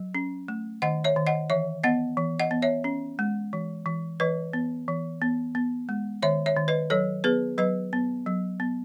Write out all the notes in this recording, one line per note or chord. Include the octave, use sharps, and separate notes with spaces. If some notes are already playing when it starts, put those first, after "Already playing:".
Already playing: F#3
C#4
A3
D#3 D#5 F#5
C#5 E5
D#3
D#5 F#5
E3 C#5 E5
B3 D#5 F#5
E3
D#5 F#5
B3
C#5 E5
C#4
G#3
E3
E3
E3 B4 D#5
B3
E3
B3
B3
G#3
D#3 C#5 E5
C#5 E5
D#3
B4 D#5
F#3 A4 C#5
B3 G#4 B4
F#3 B4 D#5
B3
F#3
B3